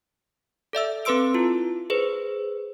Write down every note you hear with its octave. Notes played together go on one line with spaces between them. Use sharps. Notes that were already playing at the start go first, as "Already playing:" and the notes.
A4 D5 E5 E6
C4 A4 B4 C6 E6 D7
E4 F4
G#4 B4 C5